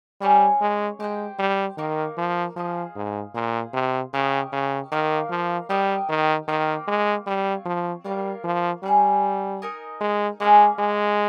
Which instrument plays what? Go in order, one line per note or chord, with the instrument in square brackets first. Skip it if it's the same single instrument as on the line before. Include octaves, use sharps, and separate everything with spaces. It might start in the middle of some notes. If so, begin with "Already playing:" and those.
[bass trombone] G3 [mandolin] C#4 G#4 C#5
[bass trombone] G#3
[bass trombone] G#3 [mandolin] G4 C5 G5
[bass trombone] G3
[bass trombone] D#3 [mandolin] A#3 D#4 A#4
[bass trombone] F3
[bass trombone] F3 [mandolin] F4 G#4 C5 D#5
[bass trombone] G#2
[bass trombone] A#2 [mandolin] G#4 C5 F5
[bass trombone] C3
[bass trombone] C#3 [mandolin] C#4 G4 A#4 D#5
[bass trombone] C#3
[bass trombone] D#3 [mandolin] A#3 D#4 A#4 F5
[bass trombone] F3
[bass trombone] G3 [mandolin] G4 A#4 D#5 G5
[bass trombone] D#3
[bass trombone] D#3 [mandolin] A#3 F4 C5 G5
[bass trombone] G#3
[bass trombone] G3 [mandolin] C4 F4 A#4 C#5
[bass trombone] F3
[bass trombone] G3 [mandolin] A#3 F4 A#4 C#5
[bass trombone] F3
[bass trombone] G3 [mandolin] C#4 G#4 C5
[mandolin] D#4 A#4 D#5 G#5
[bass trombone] G#3
[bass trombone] G#3 [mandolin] A#3 C#4 G#4
[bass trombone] G#3